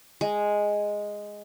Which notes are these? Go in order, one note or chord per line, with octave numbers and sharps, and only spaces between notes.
G#3